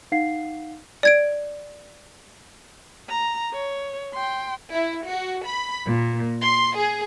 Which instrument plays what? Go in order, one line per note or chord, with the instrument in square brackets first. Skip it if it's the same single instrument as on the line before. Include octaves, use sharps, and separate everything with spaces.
[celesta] D#4 F5 F#5 C7
[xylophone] D5 G#6 D7
[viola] A#5
C#5
G5 C6
[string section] E4
F#4
B5
A#2
C6
G#4